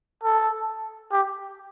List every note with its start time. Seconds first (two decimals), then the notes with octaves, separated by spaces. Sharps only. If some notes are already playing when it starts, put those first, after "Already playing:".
0.24 A4
1.12 G4